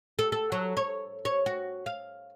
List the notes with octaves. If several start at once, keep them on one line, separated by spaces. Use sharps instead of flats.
A4
A4
F#3
C#5
C#5
F#4
F5